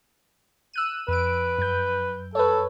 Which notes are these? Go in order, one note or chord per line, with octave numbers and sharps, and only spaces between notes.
E6 F#6 D#7
F2 B4 D7
F#2 G6
A4 B4 C#5